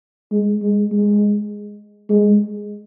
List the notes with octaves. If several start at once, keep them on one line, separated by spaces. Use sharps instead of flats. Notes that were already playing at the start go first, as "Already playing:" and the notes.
G#3
G#3
G#3
G#3